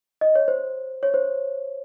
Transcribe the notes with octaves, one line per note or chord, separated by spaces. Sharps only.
D#5
C#5
C5
C#5
C5